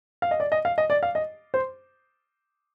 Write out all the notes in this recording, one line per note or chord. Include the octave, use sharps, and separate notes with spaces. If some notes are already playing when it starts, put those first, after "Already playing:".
F5
D#5
D5
D#5
F5
D#5
D5
F5
D#5
C5